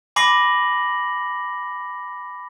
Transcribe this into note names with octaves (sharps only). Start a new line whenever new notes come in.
G#5 B5 D6 A#6 C7 F#7